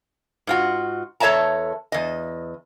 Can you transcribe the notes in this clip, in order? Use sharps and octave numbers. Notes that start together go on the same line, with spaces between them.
G#2 F4 F#4
E2 A4 C#5 E5 A5 A#5
E2 D#5